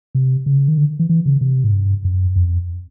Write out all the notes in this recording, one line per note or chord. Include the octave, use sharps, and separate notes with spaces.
C3
C#3
D#3
D3
E3
E3
C#3
C3
G#2
G2
F#2
F2